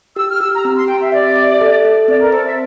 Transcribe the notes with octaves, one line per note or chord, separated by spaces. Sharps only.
G4 E6
F6
G4 E6
A#5
C4
C6
G4 G5
E5
D5 E5
E5
A4
A4
C4 D5
A#4
A4 C5
E5